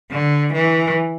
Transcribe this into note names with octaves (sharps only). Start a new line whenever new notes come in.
D3
E3